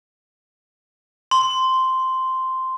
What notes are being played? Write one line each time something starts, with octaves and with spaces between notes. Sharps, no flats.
C6